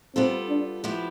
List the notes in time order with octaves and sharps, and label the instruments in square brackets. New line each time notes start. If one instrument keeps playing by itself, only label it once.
[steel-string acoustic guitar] G3 B3 F4 A4 [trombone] C4
[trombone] D4
[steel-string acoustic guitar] F3 B3 E4 G4